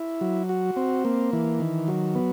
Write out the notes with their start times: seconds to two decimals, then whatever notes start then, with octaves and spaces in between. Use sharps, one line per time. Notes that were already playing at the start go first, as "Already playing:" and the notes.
Already playing: E4
0.21 F#3
0.49 F#4
0.76 C4
1.05 A#3
1.33 E3
1.60 D#3
1.88 F#3
2.15 B3